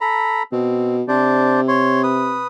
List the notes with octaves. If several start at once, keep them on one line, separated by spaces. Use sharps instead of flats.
A4 A#5 B5
B2 C4
C3 D4 C5 D5
C#5 C6
B4 D#6